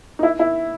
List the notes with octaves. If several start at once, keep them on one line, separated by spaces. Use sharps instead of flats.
D#4
E4
E4